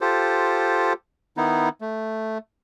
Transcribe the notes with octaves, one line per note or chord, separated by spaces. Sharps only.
F4 G4 A4 C5
D#3 B3 D#4 E4
A3